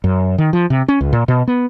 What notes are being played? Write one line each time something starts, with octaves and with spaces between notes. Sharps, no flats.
F#2
D#3
F3
C3
C#4
C#2
A#2
B2
B3